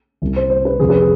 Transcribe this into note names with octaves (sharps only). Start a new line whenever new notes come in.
C2 C3 G3
C5
C5
B4
F2 C3 F3 G#4
B4
G#4